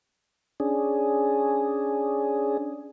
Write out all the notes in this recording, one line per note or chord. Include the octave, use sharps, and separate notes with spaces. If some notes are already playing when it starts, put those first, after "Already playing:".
C#4 D4 G#4